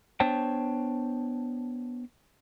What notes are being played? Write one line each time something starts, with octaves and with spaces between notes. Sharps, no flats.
B3 D4 C5 C#5 G5 A5